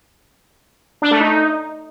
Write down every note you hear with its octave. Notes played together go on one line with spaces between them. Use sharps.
D4
A3
D#4